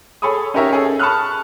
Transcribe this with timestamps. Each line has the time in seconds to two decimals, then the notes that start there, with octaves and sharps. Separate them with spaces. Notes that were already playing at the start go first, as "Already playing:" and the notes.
0.22 G#4 A4 C#5 B5 C#6 D#6
0.54 C#4 D#4 G4 A#4 C#5 E5
0.71 C#4 G#4 A4
0.99 A5 B5 C#6 D#6 F6 F#6